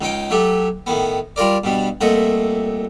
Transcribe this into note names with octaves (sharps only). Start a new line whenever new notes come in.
C#2 C#4 D#4 G5
F#3 A3 G4
A2 D#3 B3
G3 F4 A#4 D5
G2 B2 G3
C2 A#2 A3 D#5 F#5